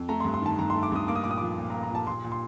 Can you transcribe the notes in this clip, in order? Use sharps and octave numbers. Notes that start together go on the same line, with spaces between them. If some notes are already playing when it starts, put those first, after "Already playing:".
Already playing: F2
A3 A#5
G2 C6
C6
D#3 A5
G2 A#5
A3 C6
D6
G2 D#6
A#3 D6
D#6
A#2 D6
D#6
F3 D6
A#2
A#5
A#3
A#5
A#2 A5
A#2 C6
A#2
C6